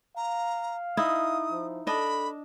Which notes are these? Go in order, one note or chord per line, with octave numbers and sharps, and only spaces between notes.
F5 A#5
D#4 E4 D#6
F3
D4 A4 D#5 B5